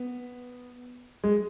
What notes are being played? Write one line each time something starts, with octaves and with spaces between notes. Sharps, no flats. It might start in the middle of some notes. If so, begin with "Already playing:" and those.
Already playing: B3
G#3